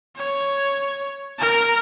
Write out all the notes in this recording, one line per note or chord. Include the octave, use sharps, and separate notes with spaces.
C#5
A#4